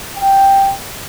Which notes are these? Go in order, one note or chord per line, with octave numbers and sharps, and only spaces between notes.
G5